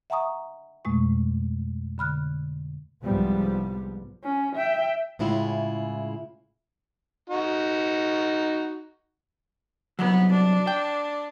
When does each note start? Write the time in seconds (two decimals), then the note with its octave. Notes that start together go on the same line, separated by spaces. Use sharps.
0.10 E5 F#5 G#5 A#5 C#6 D#6
0.85 F2 B2 G#3 A3 C#6
1.98 D3 B5 F6 F#6
3.04 C2 G#2 F3 G3 B3
4.23 C#4
4.56 E5 G5
5.19 A2 C#3 G#3 E4 F4
7.30 D#4 F#4
9.99 C2 F#3 B3
10.32 D4
10.67 G5